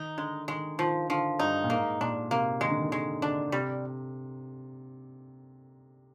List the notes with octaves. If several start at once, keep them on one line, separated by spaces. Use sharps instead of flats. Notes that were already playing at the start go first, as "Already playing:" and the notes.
Already playing: D#3 D#4
D3 G#3
D#3 G#3
D#3 F3
D3 F3
G2 D#4
A#2
G#2 A#3
A#2 D4
C3 A#3
D#3 G#3
D3
D#3
D#3 G#3
D3 D4
C3 G3